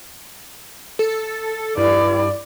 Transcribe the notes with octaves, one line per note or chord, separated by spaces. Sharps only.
A4
G2 E4 D5